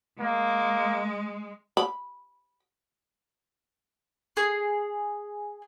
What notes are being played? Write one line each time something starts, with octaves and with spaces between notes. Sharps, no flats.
G#3 A#3
B5
G#4